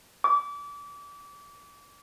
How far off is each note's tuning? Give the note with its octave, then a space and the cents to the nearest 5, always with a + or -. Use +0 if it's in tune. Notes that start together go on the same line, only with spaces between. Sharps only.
D6 -30